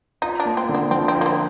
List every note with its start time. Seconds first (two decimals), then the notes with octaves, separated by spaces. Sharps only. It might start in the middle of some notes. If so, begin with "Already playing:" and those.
0.22 D#4 F4
0.40 D4
0.45 A#3
0.57 C4
0.69 D3
0.75 C4
0.91 F3 C4
1.08 C4
1.15 F4
1.21 A#3
1.26 C4